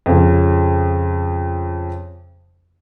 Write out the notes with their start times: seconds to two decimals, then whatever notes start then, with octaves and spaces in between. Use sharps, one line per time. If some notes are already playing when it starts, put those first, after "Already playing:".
0.06 F2 C#3